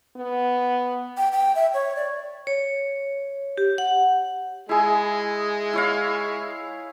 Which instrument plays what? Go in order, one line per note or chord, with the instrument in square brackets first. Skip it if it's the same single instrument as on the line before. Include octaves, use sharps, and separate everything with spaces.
[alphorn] B3
[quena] G5
G5
E5
C#5
D5
[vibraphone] C#5
G4
F#5
[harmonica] G#3 [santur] E4 G#4
[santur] E4 C#5 F5